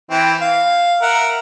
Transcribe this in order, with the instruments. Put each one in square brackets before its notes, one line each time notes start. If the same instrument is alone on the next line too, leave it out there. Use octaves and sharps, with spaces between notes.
[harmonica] E3 C4
F5
A#4 E5 F#5